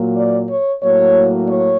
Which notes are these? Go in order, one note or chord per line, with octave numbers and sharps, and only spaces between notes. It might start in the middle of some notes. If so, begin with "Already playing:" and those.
Already playing: A#2 F#3 A#3
D5
C#5
A2 F#3 A#3 C#5
C#5